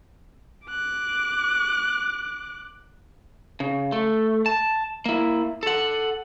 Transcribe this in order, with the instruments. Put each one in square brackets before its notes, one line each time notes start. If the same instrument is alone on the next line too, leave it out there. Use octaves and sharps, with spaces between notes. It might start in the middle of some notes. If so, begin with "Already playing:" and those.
[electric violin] D6 F#6
[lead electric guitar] C#3
A3
A5
A#3 E4
A4 F#5